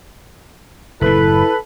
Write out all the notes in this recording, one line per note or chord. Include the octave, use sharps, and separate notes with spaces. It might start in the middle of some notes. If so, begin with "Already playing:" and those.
F#1 A2 E4 A4 B4